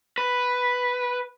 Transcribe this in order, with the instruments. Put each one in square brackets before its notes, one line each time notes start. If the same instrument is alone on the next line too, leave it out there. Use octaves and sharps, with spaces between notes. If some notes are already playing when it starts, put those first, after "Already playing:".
[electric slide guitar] B4